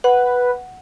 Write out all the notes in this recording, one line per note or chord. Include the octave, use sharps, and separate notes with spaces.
B4 F#5